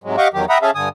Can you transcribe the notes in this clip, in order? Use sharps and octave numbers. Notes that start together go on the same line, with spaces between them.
G#2 C3 F#3 G#3
G4 D#5 F5 F#5 C#6 D6
E2 D#3 F#3 G4
E5 F#5 G5 A#5 B5 D#6
C#4 G#4 A4 E5 F5
G2 D3 G#5 D#6